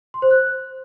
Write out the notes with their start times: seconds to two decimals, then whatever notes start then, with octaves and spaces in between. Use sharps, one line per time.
0.14 C6
0.22 C5
0.30 F#6